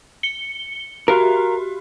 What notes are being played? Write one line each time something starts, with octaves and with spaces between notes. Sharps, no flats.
C#7 G7
F#4 G4 A#4